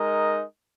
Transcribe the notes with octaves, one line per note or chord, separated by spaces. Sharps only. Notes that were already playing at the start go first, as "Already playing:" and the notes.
Already playing: G#3 D#4 A#4 D#5